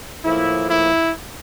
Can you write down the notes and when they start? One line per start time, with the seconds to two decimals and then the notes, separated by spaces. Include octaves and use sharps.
0.24 A2 F3 A#3 E4
0.69 E4